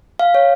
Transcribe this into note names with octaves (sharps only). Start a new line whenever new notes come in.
F5
C#5